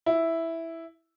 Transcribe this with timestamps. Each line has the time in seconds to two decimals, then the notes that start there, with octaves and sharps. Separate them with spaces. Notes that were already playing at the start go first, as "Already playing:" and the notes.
0.06 E4